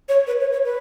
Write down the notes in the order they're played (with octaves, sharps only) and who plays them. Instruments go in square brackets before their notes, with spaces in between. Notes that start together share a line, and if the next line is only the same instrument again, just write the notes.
[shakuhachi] C#5
B4
C#5
C#5
B4